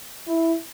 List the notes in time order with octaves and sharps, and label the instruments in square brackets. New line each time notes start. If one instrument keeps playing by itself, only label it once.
[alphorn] E4